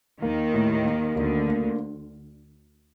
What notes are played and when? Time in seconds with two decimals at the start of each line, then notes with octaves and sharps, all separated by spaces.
0.22 D#2 D#3 A#3
0.54 A2
0.85 A#3
1.16 D2 D3 A#3
1.48 A#3